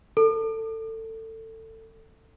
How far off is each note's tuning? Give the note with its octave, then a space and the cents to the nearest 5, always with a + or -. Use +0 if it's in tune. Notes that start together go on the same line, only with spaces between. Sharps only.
A4 +20